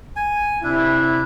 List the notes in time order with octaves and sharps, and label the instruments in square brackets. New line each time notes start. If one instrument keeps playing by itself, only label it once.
[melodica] G#5
[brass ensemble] C3 E4 [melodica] D4